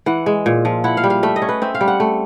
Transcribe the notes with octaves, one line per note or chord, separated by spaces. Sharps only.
E3 F#5
G#3
A#2
F3
E4 F#5
F5
G3
F5
A3 E5
D#5
C#4
B4
C4 E5
F5
G3
F#5
A3